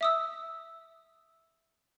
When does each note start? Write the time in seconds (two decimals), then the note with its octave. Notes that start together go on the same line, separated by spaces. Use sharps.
0.01 E5 D#6 E6